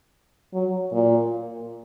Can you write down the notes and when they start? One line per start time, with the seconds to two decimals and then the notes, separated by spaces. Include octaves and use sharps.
0.53 F#3
0.92 A#2